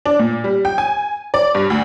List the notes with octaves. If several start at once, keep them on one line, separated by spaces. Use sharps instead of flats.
D4
A#2
G3
G5
G#5
D5
G2
D2